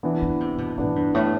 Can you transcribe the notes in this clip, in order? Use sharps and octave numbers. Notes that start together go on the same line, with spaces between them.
E3 B3 D4
D3
C3
B2
A2 E3 B3 D4
G2
A2